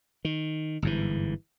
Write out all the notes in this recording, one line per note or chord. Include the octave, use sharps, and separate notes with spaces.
D#3
G1 G#2 E3